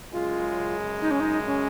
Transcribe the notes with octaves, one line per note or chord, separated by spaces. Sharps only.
F#2 C#3 G#3 F4
D#4
C#4
D#4
C#4